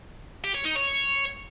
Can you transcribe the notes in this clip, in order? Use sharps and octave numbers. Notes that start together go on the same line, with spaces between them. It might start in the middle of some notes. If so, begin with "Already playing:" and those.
G4
C#5
D#4
C#5